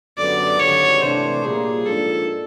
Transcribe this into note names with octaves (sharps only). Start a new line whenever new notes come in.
F#2 D3 G3 B3 D5
G#1 G2 D3 C#5
C3 E3 A3 D4 C5
A#2 G3 A#3 G#4
G#2 F3 A#3 D4 A4